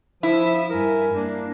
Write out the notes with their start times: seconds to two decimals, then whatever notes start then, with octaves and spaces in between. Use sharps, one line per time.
0.23 F3 E4 E5 D#6
0.70 G2 A#4 G#5
1.14 A#3 D4